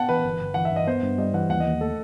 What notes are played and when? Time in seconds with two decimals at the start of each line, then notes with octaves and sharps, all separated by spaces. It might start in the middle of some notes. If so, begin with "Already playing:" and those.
Already playing: B3 F#5 G5 A5
0.09 E3 B4
0.24 G1
0.40 G1
0.54 E3 F#5
0.65 E5
0.71 G2
0.76 D#5
0.87 B3 C5
1.02 G2
1.18 G3 D#5
1.34 E3 F#5
1.49 D#2 F#5
1.60 D#5
1.65 D#2
1.81 A3 A4